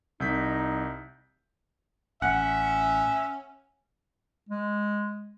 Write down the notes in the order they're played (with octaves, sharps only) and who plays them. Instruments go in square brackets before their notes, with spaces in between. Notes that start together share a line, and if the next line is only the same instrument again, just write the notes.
[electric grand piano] C2 G6 B6 [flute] D#4
[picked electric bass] A1 [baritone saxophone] C#4 [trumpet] E5 [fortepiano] F#5
[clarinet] G#3